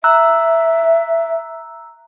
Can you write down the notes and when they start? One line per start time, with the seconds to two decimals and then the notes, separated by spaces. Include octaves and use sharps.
0.04 E5 A#5 E6 F#6